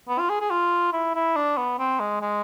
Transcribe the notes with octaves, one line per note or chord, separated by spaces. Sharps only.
B3
F4
G#4
G#4
F4
E4
E4
D4
B3
C4
G#3
G#3